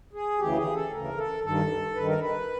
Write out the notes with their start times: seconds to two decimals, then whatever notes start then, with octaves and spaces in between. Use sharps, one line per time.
0.13 G#4
0.39 D2 C#3 E3 G4
0.56 G#4
0.74 A4
0.90 D2 C#3 E3 A#4
1.17 A4
1.43 G2 D#3 A4
1.95 G2 D#3 B4
2.07 A#4
2.20 B4